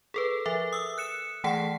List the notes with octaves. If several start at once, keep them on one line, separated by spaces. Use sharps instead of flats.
G#4 A4 B4
F3 A4 E5
D#6 E6
F#6 C#7 E7
E3 A3 G#4 F#5 A5 C7